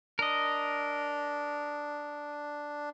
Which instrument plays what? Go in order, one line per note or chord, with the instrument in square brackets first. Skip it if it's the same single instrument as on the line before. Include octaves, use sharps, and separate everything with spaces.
[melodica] D4 [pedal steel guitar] A#4 D#5